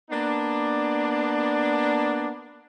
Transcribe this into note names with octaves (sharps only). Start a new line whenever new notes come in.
A#3 B3 D4